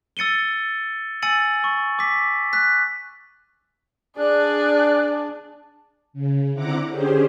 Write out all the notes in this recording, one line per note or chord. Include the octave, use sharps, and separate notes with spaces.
E6 A6 C#7 D#7 G7
G#5 E6 A6 C#7 D#7 F#7
C#6
D6 B6
F#6 B6
D4 G#4 D5 F#6
C#3
D3 C4 E4 F#5 A#5 D6
D3 C#4 G4 G#4 C5